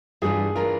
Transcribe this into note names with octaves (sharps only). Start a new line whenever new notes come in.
G2 E3 A3 D4 F4 G#4
E3 A3 D4 F4 A#4